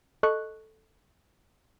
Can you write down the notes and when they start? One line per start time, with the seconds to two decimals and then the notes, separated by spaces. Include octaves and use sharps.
0.23 A4 D#5 C#6 F#6